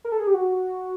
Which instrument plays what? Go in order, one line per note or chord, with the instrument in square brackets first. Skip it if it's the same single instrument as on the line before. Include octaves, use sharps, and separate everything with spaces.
[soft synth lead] A#4
A4
G#4
G4
F#4